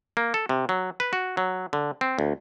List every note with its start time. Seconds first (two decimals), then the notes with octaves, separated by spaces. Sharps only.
0.17 A#3
0.34 A4
0.49 C3
0.69 F#3
1.00 B4
1.13 F#4
1.37 F#3
1.73 D3
2.01 C4
2.19 D2